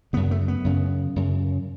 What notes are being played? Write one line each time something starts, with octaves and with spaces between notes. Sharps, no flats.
F#2 C#3 B3
A3
B3
F#2 C#3
F#2 C#3